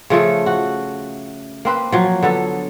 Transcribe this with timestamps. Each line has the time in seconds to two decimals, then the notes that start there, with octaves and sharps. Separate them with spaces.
0.10 C#3 F3 A3 A4
0.46 F#4
1.65 A#3 C4 B4
1.92 F3 F#3
2.23 D3 B3 A4